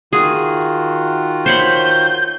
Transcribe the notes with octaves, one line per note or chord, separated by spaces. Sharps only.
D#3 F4 F#4 G#4
C5 C#5 B5 G6